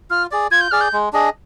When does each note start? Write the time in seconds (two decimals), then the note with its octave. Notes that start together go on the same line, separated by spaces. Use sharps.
0.10 F4 F6
0.31 G#4 D5
0.51 F4 G#6
0.61 G6
0.71 G#4 D5 F6
0.81 G6
0.93 G#3
1.13 D4 G#4 D#5